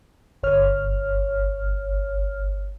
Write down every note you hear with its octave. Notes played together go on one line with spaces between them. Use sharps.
G1 C#5 F6